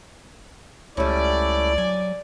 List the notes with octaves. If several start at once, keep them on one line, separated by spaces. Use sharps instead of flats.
C#2 G3 A3 C#4 E4 D5
F#3 G#5